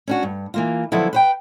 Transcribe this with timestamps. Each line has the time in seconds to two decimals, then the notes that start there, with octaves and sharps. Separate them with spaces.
0.07 C#4 D4 F#4
0.23 G2
0.54 E3 A#3 F4
0.92 D3 F3 F#3 B3 E4
1.13 B4 C5 G5